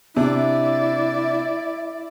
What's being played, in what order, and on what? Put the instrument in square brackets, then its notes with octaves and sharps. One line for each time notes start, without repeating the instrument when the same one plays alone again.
[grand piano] C3 D4 [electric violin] E4 D5 [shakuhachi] E5